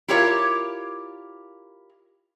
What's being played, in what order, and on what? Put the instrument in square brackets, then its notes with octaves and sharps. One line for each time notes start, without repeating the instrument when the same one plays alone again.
[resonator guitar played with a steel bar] E4 F4 G4 A#4 C#5 D5